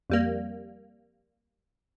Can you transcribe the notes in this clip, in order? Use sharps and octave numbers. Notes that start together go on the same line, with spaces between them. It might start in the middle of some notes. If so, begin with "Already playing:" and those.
F2 G3 A#3